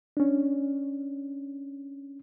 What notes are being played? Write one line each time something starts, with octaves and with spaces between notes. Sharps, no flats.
C#4 D4